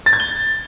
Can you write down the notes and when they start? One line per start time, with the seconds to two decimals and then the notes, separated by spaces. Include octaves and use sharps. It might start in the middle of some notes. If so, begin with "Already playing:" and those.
0.06 A6
0.13 G#6
0.20 G7